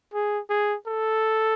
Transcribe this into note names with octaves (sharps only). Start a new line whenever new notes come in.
G#4
G#4
A4